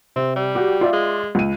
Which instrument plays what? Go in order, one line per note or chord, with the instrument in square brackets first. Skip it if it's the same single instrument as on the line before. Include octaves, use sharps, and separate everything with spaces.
[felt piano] C3 [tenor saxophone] C4
[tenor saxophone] G3
[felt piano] F#4 G4
F4 D5 E5
[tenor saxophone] G#3
[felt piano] C#2 D#7